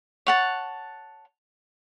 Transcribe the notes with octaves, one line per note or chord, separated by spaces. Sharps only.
C#5 F#5 A5